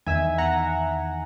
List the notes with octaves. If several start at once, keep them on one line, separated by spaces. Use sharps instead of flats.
E2 D#3 E5 G#5
F#5 A#5